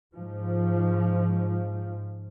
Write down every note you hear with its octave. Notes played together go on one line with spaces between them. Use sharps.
G#2 F3